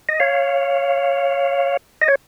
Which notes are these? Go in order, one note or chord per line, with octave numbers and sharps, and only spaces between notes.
D#5
C#5 F5
D#5
C#5